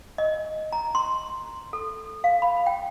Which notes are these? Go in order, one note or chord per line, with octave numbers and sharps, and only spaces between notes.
D#5
A#5
C6
A4
F5
B5
G5